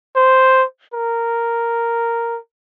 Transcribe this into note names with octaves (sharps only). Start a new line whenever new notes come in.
C5
A#4